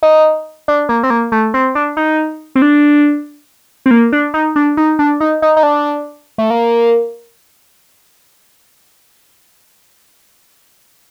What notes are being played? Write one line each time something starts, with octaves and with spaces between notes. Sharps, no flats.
D#4
D4
A#3
C4
A#3
A3
C4
D4
D#4
C4
D4
C4
A#3
D4
D#4
D4
D#4
D4
D#4
D#4
D#4
D4
A3
A#3